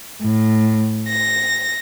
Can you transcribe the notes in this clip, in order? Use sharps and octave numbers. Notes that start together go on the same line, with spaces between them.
A2
A#6